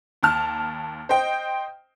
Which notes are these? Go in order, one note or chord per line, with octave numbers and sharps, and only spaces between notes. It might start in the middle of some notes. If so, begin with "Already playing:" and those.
D#2 A5 F6
C5 D#5 G5